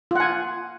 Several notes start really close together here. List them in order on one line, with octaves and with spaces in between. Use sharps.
F4 F#5 G#5